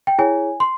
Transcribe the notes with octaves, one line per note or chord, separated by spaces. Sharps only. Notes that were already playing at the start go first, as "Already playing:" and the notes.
G5
E4 G#4 C#5 G#5
C6